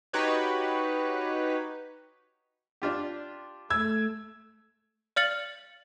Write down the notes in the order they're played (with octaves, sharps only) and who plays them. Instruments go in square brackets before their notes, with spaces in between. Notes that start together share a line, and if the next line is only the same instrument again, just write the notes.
[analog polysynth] D#4 F#4 G4 B4 C#5
[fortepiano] D4 F4 G4
[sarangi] A3 [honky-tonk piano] E6 G#6
[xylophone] D5 F5 F6 A6 C#7 F#7